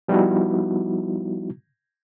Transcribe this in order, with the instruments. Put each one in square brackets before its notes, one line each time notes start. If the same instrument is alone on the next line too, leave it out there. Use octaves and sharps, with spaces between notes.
[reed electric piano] F3 G3 B3 D#4 E4 F#4